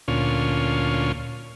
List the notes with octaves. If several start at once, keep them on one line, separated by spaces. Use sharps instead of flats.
D2 A#2 C#4 F4